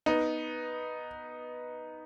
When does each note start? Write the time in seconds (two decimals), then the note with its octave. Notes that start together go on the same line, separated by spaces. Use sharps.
0.06 B3 D#4